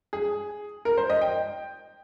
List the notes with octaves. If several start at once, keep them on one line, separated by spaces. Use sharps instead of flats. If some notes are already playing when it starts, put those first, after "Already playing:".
G#4
A#4
C5
D#5
G5